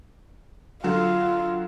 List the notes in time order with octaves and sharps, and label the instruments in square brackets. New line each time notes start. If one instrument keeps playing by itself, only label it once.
[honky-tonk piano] D3 F#3 F#4 [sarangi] F4